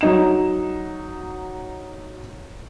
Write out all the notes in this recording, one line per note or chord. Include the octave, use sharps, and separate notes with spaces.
F#3 D#4 E7